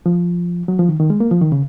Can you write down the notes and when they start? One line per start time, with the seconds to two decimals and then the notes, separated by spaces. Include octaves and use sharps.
0.06 F3
0.68 F#3
0.79 F3
0.89 D#3
0.99 D#3
1.10 G#3
1.20 A#3
1.31 F3
1.41 D#3
1.52 C#3